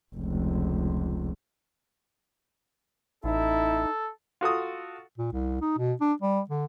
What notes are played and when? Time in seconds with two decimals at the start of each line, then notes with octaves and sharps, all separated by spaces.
0.15 F1 C#2
3.24 A1 D#4 E4 A4
4.41 F4 F#4 A4 D#6
5.18 A#2
5.33 C2
5.61 D#4
5.78 B2
6.01 D4
6.22 G3
6.50 D3